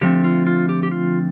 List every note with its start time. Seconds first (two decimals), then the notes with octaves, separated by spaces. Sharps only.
0.01 D3 F3 A3 C4 G4
0.24 F4
0.47 F4
0.69 G4
0.83 G4
0.91 F4